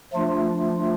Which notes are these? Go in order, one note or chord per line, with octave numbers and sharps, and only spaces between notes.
F3 A3 D4 F4